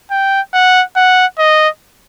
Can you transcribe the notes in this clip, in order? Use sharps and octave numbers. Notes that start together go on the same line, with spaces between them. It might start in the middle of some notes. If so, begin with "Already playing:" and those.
G5
F#5
F#5
D#5